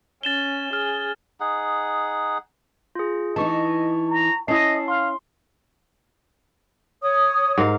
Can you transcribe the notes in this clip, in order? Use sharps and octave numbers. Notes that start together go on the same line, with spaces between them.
C#4 A6 E7 G7
G#4 F6
D#4 G#4 F#5
F4 G#4
E3 D#4 D#5 A5 C#6
A#5
C#4 E4 D#5 A5 C7
F5 C6
C#5 D#6
G#2 A#4 F5